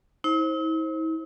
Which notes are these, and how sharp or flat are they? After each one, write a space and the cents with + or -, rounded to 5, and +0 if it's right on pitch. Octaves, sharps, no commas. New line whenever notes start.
E4 -45 C5 +20